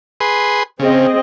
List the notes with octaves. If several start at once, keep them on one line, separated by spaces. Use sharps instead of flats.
G#4 B4 C6
C#3 C4 G#4 D#5